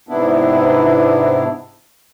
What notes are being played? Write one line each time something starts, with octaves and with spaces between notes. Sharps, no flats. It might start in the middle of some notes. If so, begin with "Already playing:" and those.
G#2 C3 B3 D4 E4